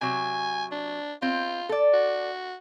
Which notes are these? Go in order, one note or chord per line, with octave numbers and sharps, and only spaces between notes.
C3 F#3 G#5
D4
C4 F4
A4 D5
F#4